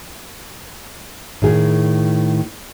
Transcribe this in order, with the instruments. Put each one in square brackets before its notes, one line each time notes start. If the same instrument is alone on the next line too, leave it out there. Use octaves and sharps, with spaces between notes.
[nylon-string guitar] A2 D#3 G#4